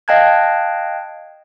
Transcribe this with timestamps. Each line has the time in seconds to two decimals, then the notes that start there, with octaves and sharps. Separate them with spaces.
0.08 D#5 F5 G5 A5 F#6 G#6